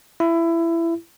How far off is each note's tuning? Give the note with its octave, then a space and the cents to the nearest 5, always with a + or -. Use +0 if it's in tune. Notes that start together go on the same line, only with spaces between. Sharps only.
E4 +20